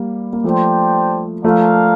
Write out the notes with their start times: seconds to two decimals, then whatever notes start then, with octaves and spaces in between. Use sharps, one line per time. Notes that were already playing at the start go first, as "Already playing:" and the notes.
Already playing: G3 A#3
0.33 A#3
0.44 F3 A3 D4 G4 C5 G5
1.44 F3 A3 D4 F4 A#4 F5